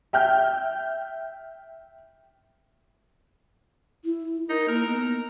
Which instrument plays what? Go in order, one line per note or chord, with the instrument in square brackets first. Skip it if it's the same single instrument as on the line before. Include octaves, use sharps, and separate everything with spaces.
[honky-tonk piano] E5 G5 F6 G6
[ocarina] E4
[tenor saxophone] D#4 [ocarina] A#4
[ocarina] A#3 [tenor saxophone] A#4
[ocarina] B3